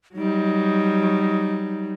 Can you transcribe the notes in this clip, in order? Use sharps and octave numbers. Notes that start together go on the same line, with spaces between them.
F#3 G3 D#4